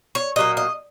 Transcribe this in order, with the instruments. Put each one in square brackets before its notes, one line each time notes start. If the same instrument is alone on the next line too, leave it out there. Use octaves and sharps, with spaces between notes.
[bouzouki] C#5
A#2 F#3 A#3 D#5
D#5